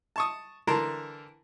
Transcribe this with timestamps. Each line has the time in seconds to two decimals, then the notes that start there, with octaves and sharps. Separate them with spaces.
0.16 A5 C#6 D#6
0.67 D3 E3 A#4 A5 A#5 C6